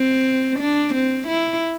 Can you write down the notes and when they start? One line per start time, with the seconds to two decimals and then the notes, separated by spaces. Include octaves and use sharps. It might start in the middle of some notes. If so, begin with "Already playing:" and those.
Already playing: C4
0.59 D4
0.94 C4
1.27 E4